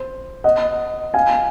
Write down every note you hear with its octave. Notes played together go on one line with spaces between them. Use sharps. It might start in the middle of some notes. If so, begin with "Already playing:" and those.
Already playing: C5
D#5 F#5
F5 G#5